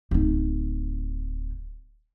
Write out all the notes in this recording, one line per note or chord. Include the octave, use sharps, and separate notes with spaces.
D1 D#4